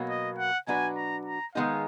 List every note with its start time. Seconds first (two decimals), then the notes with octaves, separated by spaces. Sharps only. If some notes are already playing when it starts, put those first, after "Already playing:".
Already playing: B2 F#3 A#3
0.10 D#5
0.38 F#5
0.67 B2 F#3 D4 F#4 B4 G#5
0.97 A#5
1.25 A#5
1.55 D#3 G#3 B3 D#4 G#4 F5